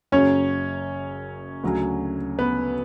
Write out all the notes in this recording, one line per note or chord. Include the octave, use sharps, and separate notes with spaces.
F#1 F#2 C#3 F#3 C#4 C#5
D2 C#3 F#3 C#4
B3 B4